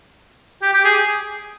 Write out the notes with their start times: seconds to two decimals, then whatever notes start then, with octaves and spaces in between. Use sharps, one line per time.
0.62 G4
0.73 G4
0.84 G#4